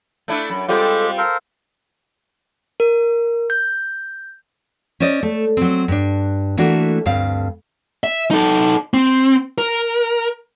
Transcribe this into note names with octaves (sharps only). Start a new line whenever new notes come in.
A3 D4 E4
F#2 B5
G3 G#3 C4 F4 G4 A4
A4 A#4 C5 F5
A#4
G6
C#4 C5 D5 D#5
A3
F#3 C4
G2 D4
E3 A3 A#3 D4 F#4
D2 G2 C4 F5
E5
D#4 A4
C4
A#4